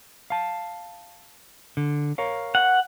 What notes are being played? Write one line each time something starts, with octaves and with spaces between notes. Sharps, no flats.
F5 A5
D3
A#4 C#5 F5
F#5